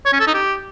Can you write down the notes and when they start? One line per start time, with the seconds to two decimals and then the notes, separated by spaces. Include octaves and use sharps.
0.06 C#5
0.13 C#4
0.20 A4
0.27 D#4
0.34 G4